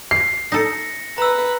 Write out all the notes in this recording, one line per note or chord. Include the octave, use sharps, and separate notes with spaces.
C7
D#4 A4 A#6 C#7
B4 A#5 E6